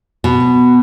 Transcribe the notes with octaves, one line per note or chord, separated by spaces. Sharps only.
B2